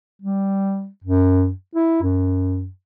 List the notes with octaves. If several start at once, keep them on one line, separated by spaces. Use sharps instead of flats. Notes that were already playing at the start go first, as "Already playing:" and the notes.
G3
F#2
E4
F#2